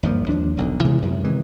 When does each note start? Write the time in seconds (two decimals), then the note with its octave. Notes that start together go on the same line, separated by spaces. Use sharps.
0.03 G#1 G2 F3 A#3
0.29 D#2 F3 D4
0.57 E1 B1 D3
0.85 C3 E3 G#3 B3
1.02 F#2 C3
1.24 C3 D#3 E3 G#3